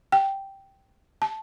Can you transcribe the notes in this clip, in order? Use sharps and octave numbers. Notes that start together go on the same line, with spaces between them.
G5
A5